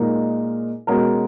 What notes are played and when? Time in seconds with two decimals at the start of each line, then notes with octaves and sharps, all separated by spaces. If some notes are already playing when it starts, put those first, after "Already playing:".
Already playing: A#2 G#3 D#4 A#4
0.87 B2 G#3 C#4 F#4 A#4